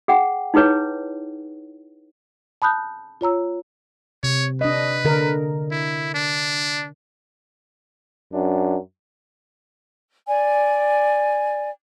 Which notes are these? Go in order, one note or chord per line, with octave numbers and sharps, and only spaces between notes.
G#4 F#5 G5
D#4 E4 G#4 B4 C#5
A5 B5 D#6 F#6 G6
F4 C#5 A#5 E6
C3 C#5
D4 B4 D#5
D3 A#4
E4
D4
F#2 D4
D5 G#5